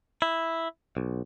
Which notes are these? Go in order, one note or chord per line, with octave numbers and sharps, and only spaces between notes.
E4
B1